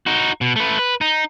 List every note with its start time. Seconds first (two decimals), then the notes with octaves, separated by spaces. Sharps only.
0.06 D#4 F#4
0.41 B2
0.56 A3 B4
0.79 B4
1.01 D#4